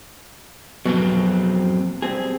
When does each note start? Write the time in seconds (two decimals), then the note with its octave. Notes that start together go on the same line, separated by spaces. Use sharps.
0.85 F2 B2 F#3 A#3 C4
2.02 G3 C4 G#4